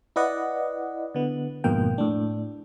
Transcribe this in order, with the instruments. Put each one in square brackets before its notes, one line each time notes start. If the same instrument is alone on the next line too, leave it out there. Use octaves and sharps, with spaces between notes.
[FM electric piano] E4 B4 D5 D#5 F#5
D3 B3
G#1 F2 G#2 B2 A#3 G5
A2 D4